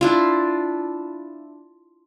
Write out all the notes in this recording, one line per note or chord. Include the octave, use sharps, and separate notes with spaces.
D4 E4 F4